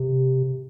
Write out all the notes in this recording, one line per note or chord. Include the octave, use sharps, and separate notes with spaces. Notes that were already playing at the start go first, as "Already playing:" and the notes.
Already playing: C3